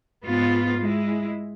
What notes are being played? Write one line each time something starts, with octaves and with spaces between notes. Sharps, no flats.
G#2 B3 F4
G#3 E4